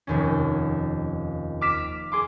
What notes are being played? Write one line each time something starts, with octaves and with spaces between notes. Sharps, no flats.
F1 D#2 C#4
D6 F6 B6 E7
G#4 C6 D6